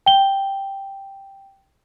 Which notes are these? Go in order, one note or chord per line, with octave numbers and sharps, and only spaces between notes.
G5 G7